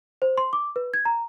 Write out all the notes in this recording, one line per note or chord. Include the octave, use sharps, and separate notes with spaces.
C5
C6
D6
B4
G#6
A#5